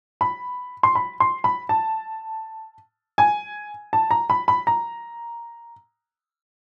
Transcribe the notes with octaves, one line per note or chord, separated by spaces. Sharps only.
B5
C6
B5
C6
B5
A5
G#5
A5
A#5
B5
B5
A#5